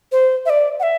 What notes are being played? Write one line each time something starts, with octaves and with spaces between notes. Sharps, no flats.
C5
E5
D5
F#5
E5